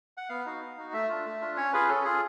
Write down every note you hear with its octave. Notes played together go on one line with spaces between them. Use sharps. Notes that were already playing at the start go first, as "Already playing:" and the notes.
F#5
B3 F5
D#4 F#4
B3
D#4 F#4
A3 E5
D4 F4
A3
D4 F4
C#4 C#5
F4 G#4 B4
C#4 A4
F4 G#4